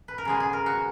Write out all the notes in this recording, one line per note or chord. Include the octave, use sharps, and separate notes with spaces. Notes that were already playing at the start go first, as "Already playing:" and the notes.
B4
A#4
C#3 G#3 B3 G#4
G#4
A#4
F#4